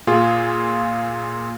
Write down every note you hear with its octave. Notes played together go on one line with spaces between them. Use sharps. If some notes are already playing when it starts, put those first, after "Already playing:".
A#2 F4 G#4